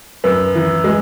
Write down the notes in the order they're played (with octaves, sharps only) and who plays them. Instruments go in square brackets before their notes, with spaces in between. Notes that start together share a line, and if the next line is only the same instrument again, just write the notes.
[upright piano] F#2 [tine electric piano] B4
[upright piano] E3
G#3